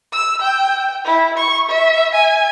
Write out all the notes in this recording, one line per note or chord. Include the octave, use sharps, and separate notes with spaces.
E6
G5
E4
C#6
E5
G#5